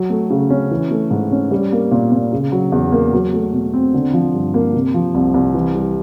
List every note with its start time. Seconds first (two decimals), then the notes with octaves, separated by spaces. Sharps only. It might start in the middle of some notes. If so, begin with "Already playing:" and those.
Already playing: F#3
0.10 A3
0.30 C#3
0.50 C#4
0.71 E3
0.91 A3
1.11 G#2
1.32 C#4
1.51 G3
1.72 A#3
1.91 A#2
2.12 A#2
2.33 C#3
2.52 F#3
2.72 E2
2.92 A#3
3.13 F#3
3.33 A3
3.53 B2
3.73 C4
3.94 D3
4.14 F3
4.34 G2
4.54 A#3
4.74 C3
4.94 F3
5.14 C2
5.34 C2
5.54 E3
5.75 G3